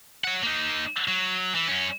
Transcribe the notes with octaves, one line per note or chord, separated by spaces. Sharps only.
C#5 F#5
A#3 D#4
F#3
E3
F#2 C#4